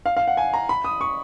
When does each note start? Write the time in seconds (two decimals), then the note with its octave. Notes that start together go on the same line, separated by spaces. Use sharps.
0.06 F5
0.17 F5
0.27 F#5
0.37 G#5
0.53 A#5
0.69 B5
0.84 D#6
1.01 C#6